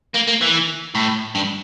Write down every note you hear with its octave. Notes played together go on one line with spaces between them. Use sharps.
A#3
A#3
E3
A2
G2